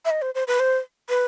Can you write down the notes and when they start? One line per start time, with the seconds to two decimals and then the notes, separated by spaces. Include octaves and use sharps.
0.05 E5
0.10 D#5
0.22 C5
0.35 C5
0.47 B4
0.60 C5
1.09 B4